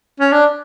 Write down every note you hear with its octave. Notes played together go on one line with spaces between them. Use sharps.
C#4
D4